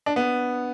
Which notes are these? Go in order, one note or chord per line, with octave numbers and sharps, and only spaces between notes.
D4
B3